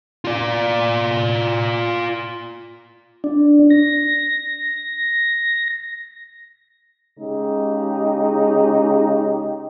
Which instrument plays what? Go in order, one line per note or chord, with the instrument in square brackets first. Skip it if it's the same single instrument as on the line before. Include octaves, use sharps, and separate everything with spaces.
[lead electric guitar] F4 D5
[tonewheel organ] D4
A#6
[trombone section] C#3 G#3 D#4 G4